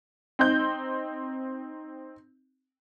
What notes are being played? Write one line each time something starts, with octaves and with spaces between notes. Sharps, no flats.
C4 D#4 G6